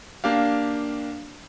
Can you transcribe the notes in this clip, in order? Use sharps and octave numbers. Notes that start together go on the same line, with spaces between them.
A#3 D4 G4 F5